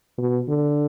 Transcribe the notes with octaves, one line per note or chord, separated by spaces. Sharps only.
B2
D3